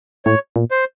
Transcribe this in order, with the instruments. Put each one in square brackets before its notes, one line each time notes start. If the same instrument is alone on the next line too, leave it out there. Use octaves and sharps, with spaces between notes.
[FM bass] A2 [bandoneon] C#5
[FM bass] A#2
[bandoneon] C5